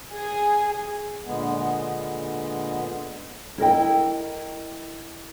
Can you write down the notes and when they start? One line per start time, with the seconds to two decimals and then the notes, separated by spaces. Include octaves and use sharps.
0.14 G#4
1.25 A#2 D3 G#3 B3
3.58 E4 A#4 D#5 G5